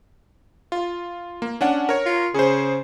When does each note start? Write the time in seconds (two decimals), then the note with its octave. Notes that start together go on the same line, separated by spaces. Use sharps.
0.72 F4
1.42 A#3
1.61 C#4 D4 F#5
1.89 A#4 C#5
2.06 F4
2.34 C#3 G#4 C5